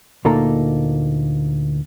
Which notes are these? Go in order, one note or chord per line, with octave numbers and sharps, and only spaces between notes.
D2 A#2 A#3 D#4 A4 A#5